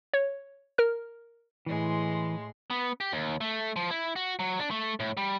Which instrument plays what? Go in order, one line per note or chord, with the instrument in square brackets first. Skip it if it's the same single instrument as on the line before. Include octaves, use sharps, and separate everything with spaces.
[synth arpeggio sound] C#5
A#4 F6
[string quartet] A2 G#3 C6 [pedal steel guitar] E3
[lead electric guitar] B3
G4
D#2
A3
F3
E4
F#4
F#3
D4
A3
A2
G3